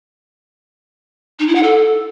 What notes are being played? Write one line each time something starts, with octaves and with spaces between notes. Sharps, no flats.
D#4
E4
F#5
A4